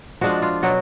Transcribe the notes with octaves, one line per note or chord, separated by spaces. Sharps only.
F3 G#3 D4 F4 F#4
F4
B2 F#3 C#4 F#4